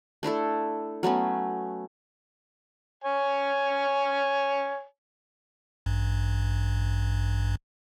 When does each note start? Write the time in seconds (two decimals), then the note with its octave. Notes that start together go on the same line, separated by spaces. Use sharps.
0.23 A3 D4 E4 A4
1.03 F#3 A3 B3 C#4
3.04 C#5 G#5
5.86 A1 G2